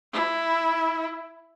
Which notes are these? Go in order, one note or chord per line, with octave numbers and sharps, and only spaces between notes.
E4